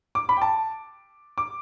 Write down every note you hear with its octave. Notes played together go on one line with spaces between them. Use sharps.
D6
B5
G5
A5
D6